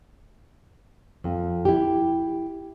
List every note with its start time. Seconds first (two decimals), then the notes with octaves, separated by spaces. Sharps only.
1.24 F2
1.65 E4 G4